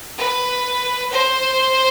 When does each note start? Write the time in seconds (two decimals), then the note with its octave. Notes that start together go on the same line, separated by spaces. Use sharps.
0.18 B4
1.12 C5